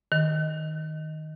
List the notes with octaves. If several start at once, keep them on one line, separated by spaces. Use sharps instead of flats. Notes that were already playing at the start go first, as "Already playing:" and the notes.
D#3